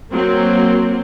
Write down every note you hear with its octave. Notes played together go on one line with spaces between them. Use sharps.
F#3 A#3 C4